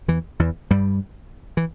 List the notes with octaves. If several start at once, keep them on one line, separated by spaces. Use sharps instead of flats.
E2 E3
E2 E3
G2 G3
E3